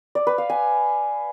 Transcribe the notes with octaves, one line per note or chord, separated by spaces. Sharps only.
D5
B4
F5
G#5